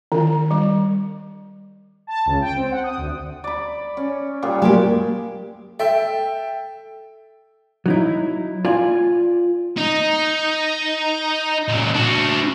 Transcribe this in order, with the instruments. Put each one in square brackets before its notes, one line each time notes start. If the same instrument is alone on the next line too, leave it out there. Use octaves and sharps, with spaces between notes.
[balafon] D#3
G3
[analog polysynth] A5
C#2
G5
C4
F#5
D#6
D2
[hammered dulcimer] D5 B5
C#4
A#2 G3 G#4
[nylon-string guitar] G#3 A#3 G4
[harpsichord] A4 [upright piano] E5 G5
[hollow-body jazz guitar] F#3 D#4 E4
F4 D5 F5 G#5
[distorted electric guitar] D#4
C#2 A#2
D4 F#4